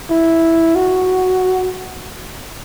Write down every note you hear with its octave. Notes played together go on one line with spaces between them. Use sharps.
E4
F#4